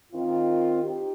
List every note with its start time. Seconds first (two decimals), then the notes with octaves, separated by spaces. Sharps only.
0.13 D#3 C4 F4
0.83 D#4 G4